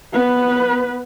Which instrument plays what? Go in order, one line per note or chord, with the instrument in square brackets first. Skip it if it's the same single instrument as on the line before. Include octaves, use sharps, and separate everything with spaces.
[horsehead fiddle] B3 B4